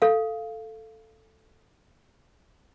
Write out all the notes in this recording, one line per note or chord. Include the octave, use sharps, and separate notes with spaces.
A4 F5